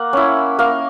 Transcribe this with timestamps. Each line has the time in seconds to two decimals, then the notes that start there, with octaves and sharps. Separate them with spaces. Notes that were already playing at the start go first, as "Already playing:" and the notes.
Already playing: A#3 F#5
0.13 C#4 E4
0.59 A#3 F5